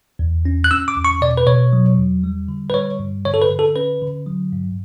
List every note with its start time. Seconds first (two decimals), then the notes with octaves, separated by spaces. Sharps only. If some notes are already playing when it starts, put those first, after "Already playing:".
0.19 E2
0.45 C#4
0.64 F#6
0.71 C#4 E6
0.88 D6
0.97 E2
1.05 C#6
1.21 B2 D5
1.37 B4
1.47 B2 C#5
1.73 F#3
1.98 E2
2.24 G3
2.48 D3
2.70 B4
2.74 G3 C#5
2.99 G2
3.25 D3 C#5
3.34 A4
3.42 B4
3.51 D3
3.59 A4
3.76 C#4 B4
4.02 D3
4.26 F#3
4.52 G2